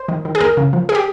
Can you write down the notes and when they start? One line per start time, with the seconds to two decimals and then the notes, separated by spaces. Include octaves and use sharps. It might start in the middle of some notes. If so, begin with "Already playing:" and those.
Already playing: C5
0.08 D#3
0.25 D#3
0.35 G#4
0.40 D#2 A#4
0.57 C#3
0.73 F3
0.89 G#4
0.95 G4